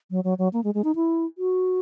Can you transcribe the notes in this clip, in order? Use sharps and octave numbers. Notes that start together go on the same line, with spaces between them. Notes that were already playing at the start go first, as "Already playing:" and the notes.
F#3
F#3
F#3
A#3
G#3
G#3
D#4
E4
F#4